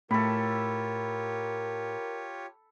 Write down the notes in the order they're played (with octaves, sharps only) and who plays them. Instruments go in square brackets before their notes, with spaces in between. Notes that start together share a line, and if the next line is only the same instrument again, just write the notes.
[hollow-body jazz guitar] A2 [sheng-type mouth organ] F4 G4 C#5 [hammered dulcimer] A4 B5 [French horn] A#4